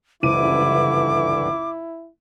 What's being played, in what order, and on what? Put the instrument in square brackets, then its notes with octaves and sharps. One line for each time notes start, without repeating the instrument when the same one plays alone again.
[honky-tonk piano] F#1 C#2 D#7 [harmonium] G2 D3 E3 [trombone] E4 [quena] D6